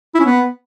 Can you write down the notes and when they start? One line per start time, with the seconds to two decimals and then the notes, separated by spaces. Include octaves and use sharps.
0.15 E4
0.20 C#4
0.25 B3